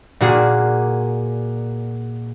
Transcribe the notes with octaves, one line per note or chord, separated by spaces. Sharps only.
A#2 A#3 F#4 G#4